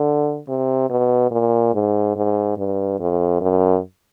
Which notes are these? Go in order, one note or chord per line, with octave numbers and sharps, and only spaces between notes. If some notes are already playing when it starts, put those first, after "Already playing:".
Already playing: D3
C3
B2
A#2
G#2
G#2
G2
F2
F#2